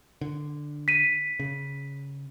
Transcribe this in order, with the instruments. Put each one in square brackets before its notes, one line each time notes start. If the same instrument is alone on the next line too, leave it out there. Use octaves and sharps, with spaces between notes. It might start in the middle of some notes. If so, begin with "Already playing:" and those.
[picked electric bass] D3
[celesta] B6 D#7
[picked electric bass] C#3